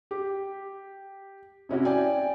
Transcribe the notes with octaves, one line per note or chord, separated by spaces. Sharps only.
G4
C3 C#4 E4 F#4
D5 G5 G#5